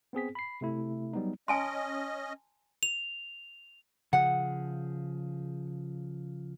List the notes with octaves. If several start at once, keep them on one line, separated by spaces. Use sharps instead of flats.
B3 C4 G#4 B6
B5 C7
C3 A3 E4
F#3 G3 B3 D#4
C#4 D#5 G#5 A5 C6
F7
C#3 F3 G#4 F#5